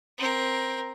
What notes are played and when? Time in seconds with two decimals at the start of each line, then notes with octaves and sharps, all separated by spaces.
0.18 C4 A#4